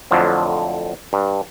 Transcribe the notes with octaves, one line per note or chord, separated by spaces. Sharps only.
F2 A2 D3 F3 F#3
G2